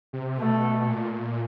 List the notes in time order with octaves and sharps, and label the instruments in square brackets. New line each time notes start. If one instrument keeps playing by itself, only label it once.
[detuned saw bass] C3
[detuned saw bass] B2 [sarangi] A3
[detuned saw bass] A#2